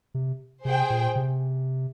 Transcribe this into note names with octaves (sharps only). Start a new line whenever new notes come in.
C3
C3 G#4 C5 G5
A#2
C3